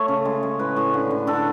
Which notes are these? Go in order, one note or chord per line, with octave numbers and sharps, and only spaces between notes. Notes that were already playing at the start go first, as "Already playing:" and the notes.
Already playing: A3 C#5
C#3
G#3
G#3
A2 B4
A2
D3
D3
D3 A4